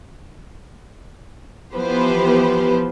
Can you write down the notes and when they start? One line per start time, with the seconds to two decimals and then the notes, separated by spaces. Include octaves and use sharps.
1.74 E3 F3 B3 G4 B4 C5